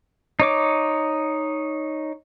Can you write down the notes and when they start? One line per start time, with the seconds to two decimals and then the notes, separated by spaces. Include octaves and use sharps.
0.40 D#4 C#5 D6